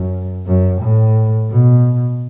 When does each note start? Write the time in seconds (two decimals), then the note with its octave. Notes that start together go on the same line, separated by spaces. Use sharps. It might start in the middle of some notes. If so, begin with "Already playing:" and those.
Already playing: F#2
0.47 F#2
0.82 A2
1.50 B2